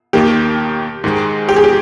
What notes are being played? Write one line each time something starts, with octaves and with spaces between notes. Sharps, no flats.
D#2 D#3 A#3 G4
G#2 D#3 G#3
G4
G#4
G4